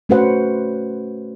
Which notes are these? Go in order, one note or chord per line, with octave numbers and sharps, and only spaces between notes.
A3 C#4 F#4 B4 C5 F#5